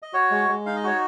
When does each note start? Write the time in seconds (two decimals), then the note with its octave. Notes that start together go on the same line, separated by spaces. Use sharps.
0.02 D#5
0.13 F#4 C#5
0.31 G#3
0.48 G#3
0.66 D#4 F5
0.76 D#5
0.84 F#4 C#5